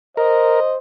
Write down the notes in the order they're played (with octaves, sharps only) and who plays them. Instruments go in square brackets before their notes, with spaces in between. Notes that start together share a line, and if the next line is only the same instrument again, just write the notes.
[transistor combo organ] A#4 [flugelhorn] C5 [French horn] D#5